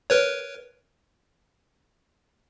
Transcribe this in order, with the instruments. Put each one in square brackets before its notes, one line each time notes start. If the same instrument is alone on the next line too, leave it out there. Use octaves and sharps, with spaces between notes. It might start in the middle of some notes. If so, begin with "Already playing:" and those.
[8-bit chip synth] A#4 B4 C#5